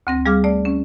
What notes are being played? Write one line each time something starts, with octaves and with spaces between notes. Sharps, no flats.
D2 C4 A#6
G3 G#4 F5 D6 F6
A3 D5
C#4